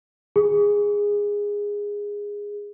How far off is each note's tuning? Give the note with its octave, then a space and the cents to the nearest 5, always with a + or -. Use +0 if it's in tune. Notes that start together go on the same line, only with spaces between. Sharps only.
G#4 -15